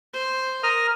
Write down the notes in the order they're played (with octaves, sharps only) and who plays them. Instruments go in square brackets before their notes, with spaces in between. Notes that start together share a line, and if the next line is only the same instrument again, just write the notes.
[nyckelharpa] C5
[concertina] A#4 D#6 F6